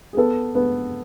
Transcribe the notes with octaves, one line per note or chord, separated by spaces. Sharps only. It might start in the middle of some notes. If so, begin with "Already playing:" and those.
G#4
B3 A4
B3